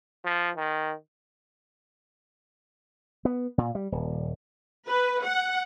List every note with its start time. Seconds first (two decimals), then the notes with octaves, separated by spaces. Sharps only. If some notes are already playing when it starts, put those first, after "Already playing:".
0.25 F3
0.56 D#3
3.25 B3
3.58 A#2
3.75 G3
3.92 D#1
4.88 B4
5.23 F#5